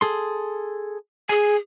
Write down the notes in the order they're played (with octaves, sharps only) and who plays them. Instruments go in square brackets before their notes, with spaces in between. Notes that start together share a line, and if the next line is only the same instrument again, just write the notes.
[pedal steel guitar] G#4 A4 C6
[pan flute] G#4 [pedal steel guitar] G#5